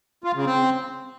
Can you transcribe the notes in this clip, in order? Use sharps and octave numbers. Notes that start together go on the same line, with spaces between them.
F4
C#3
C4